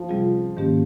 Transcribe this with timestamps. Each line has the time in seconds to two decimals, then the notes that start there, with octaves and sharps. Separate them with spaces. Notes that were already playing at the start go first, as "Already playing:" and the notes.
Already playing: F3
0.09 C3 G3 C4 F4 G#4
0.57 G#2 D#3 A#3 C#4 G4